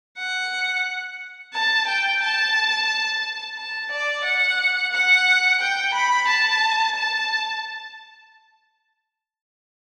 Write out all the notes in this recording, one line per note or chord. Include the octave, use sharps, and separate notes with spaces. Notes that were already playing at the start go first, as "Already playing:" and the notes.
F#5
A5
G5
A5
A5
D5
F#5
F#5
G5
B5
A5
A5